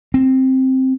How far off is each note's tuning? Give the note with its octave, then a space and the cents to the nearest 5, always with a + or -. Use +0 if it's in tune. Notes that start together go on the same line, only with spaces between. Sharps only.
C4 +5